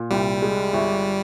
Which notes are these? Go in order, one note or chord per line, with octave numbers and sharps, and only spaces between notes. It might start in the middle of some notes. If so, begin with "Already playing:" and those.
Already playing: A#2
C2 G3
G#3
G1